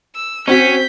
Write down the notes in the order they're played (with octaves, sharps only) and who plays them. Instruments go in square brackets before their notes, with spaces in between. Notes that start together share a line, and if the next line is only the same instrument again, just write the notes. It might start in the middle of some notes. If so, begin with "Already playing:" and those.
[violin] E6
[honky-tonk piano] C4 F#4 [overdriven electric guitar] C#4 [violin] G6 B6